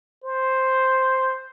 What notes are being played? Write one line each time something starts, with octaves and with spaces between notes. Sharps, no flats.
C5